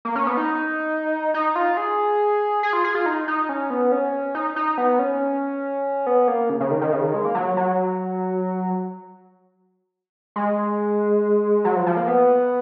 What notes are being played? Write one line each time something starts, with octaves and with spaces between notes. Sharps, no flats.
A#3
C#4
B3
D#4
D#4
F4
G#4
G#4
F4
G#4
F4
D#4
D#4
C#4
B3
C#4
D#4
D#4
B3
C#4
B3
A#3
C#3
C#3
D#3
D#3
C#3
D#3
G#3
A#3
F#3
F#3
G#3
F#3
F3
F3
A#3
B3